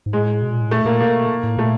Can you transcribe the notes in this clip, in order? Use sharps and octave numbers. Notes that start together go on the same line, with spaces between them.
G#2
A2 G#3
B2
A#2
A2
A#2 A3
A#2 A#3
B2 A#3
A2
A#2 A3